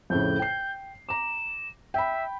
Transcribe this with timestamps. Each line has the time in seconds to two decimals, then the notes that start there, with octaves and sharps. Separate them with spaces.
0.10 F2 A2 C#3 G6
0.39 G5 C7
1.09 A#5 D6 E7
1.94 E5 G5 B5